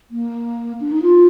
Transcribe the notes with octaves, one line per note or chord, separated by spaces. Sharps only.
A#3
D4
D#4
F4